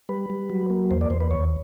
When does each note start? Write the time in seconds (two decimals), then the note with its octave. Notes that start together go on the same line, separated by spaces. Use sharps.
0.09 G3 B4
0.30 G3
0.50 F#3
0.70 A#3
0.91 E2 C5
1.01 D5
1.10 E2 C5
1.20 B4
1.31 D#2 C#5